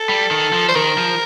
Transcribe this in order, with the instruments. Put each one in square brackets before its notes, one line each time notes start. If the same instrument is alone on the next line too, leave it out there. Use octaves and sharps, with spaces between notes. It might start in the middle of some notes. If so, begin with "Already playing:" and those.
Already playing: [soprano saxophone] A4
[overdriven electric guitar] G3
D#3
F3
[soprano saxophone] C5
[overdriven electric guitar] D#3 [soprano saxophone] A#4
[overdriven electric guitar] F3